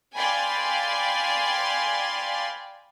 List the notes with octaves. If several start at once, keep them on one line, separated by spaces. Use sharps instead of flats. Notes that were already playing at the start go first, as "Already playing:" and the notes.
D5 F5 G5 G#5 B5 C6